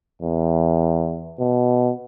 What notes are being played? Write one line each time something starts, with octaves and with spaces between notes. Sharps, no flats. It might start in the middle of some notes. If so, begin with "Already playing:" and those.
E2
B2